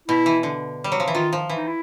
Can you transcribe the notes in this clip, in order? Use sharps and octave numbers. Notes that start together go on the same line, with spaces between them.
B2 E4
E3
D3
G3
F#3
F3
E3
D#3 F4
F3
E3
D#4
E4